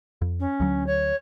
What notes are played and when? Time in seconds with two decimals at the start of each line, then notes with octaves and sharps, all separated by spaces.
0.21 F2
0.40 C#4
0.60 D2 F#3
0.86 C#5